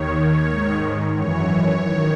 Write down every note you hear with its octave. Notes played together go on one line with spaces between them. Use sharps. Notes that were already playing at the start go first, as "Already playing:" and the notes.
Already playing: D#2 D#3 C#5
G#2 D#3
F#2 E3 C#5
D#3